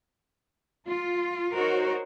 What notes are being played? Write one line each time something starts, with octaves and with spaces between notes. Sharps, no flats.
F4
D#4 F#4 A#4 C5 C#5